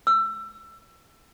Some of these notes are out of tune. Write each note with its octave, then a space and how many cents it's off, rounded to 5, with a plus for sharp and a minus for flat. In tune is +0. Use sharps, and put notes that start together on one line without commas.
E6 +25